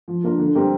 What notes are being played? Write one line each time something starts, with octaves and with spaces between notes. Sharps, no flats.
F3
A#3 D4 F4 A#4
D3
G3 C4 G4 A#4